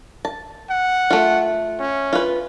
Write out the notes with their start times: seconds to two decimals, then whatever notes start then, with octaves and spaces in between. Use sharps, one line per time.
0.25 A5
0.70 F#5
1.11 A3 F4
1.80 C#4
2.13 F4 B4